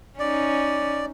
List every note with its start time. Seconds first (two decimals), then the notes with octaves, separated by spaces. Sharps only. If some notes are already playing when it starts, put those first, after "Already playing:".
0.19 C#4 D#4 D5